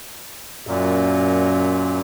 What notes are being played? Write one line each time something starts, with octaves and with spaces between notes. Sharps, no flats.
F#2 A#2